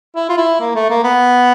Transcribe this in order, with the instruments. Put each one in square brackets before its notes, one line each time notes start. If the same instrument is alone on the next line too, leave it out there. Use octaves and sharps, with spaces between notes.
[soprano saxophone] E4
F4
E4
A#3
A3
A#3
B3